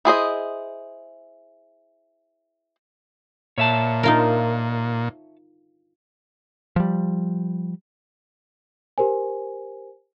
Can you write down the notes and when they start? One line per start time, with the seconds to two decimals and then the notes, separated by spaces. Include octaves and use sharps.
0.05 E4 G#4 C5 D#5
3.58 A#2 C#5 E5 A5
4.03 D#4 F4 A#4
6.76 F3 G3
8.98 G4 A#4 C5 G#5